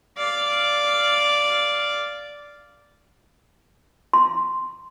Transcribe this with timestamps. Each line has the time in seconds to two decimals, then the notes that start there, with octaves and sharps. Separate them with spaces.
0.17 D5 F5
4.13 C6